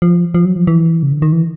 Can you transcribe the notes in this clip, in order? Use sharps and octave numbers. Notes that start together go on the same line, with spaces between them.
F3
F3
F#3
F3
E3
C#3
D3
D#3
E3